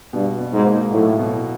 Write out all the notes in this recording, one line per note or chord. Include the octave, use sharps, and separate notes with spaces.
G2 B2
B2
G#2
A#3
A2 F#3
B2